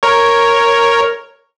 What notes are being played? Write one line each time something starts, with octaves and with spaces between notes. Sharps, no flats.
A#4 C#5